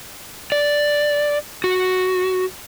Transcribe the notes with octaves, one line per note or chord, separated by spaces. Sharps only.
D5
F#4